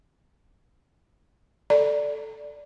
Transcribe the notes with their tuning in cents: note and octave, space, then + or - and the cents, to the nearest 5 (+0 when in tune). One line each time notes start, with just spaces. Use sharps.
A4 +0 D5 +0